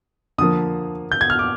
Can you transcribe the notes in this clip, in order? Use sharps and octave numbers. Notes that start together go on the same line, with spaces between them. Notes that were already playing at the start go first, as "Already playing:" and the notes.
D3 F3 A#3 D#6
G6
G#6
F6
D6